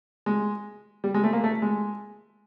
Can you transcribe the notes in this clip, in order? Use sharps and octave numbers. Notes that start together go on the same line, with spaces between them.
G#3
G3
G#3
A3
A#3
A3
G#3